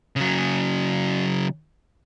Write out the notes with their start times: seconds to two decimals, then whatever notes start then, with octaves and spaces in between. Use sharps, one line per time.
0.16 C#3 F#3